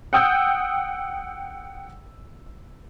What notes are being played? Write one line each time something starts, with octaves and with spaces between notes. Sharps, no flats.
F#5 G5 D#6 E6 G6